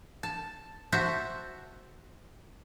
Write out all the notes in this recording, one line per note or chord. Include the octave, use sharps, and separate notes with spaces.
A5
F#4 C5 E5 A5